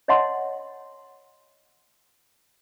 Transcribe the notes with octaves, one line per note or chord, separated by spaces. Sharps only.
C#5 D#5 E5 F#5 A5 C6